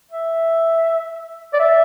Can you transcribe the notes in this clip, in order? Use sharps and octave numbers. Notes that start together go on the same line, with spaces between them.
E5
D5
E5